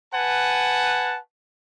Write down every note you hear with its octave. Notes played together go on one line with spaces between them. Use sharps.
B4 F#5 G#5 A5